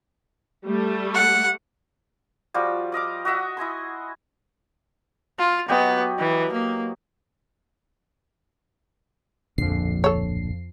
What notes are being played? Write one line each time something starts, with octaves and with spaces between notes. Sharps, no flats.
G3 A3
F#5
F3 G3 F#4 D5
D5 D#5 F5 D6
F#4 D#5 E5 F#5
E4 D#5 G#5 C6
F4
F#3 B3 G4 D#5
E3
A#3
D1 A#1 F2 D3 C7
A4 C#5